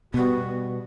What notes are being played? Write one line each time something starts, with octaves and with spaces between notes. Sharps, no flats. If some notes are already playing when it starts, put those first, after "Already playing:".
B2 G3 B3 F#4